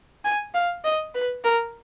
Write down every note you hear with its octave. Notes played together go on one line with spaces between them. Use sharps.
G#5
F5
D#5
B4
A#4